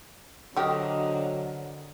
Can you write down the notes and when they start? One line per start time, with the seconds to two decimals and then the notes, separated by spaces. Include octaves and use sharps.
0.57 D3 F#3 A3 C4 G4 A#4 D#5